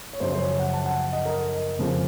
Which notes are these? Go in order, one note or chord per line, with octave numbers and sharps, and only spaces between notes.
C#5
F#2 C#3 F3 C5
C5
C#5
F#5
A5
F#5
D#5
A#4
F2 C#3 F3